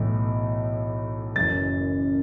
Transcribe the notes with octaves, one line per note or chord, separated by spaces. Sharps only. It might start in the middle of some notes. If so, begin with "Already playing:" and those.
Already playing: B1 A2 E3
F#1 F#2 E3 A6